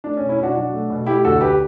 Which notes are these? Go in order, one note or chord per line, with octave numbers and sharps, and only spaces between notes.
A3 D4
C#4
B2
C#4 E4
B2 D4 F#4
F#3 D4 F#4
A3
B2
A3 E4 G4
D2 F#4 A4
D2 G4 B4